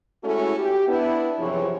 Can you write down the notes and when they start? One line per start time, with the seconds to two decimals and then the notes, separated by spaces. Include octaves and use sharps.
0.23 G#3 A3 C#4 E4 F#4 A4
0.58 G4
0.88 B3 D4 E4
1.39 F#2 C3 E3 F3 G#4 C#5